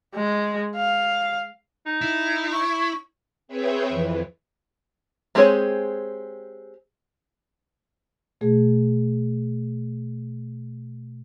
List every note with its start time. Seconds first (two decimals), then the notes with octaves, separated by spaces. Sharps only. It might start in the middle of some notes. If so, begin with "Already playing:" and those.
0.15 G#3
0.76 F5
1.86 D#4
2.01 E4
2.52 C#6
3.48 C4 G#4 B4 C#5 E5 G5
3.88 F2 E3
5.35 G#3 C4 G4 G#4 C#5
8.41 B2 A3 G#4